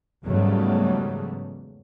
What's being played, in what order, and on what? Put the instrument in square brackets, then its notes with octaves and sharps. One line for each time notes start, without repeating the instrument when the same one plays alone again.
[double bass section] E2 G#2 C#3 F#3 G3 A3